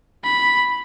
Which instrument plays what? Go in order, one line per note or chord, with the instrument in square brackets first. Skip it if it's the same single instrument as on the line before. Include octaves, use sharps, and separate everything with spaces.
[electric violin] B5